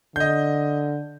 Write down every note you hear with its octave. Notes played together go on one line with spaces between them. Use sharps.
D3 D#5 G6